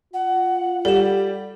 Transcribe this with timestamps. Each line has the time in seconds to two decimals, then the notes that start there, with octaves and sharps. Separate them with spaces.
0.13 F4 F#5
0.85 G3 A4 E7